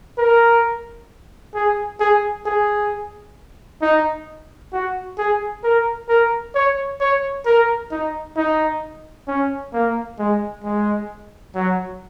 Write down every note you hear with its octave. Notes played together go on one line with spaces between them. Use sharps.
A#4
G#4
G#4
G#4
D#4
F#4
G#4
A#4
A#4
C#5
C#5
A#4
D#4
D#4
C#4
A#3
G#3
G#3
F#3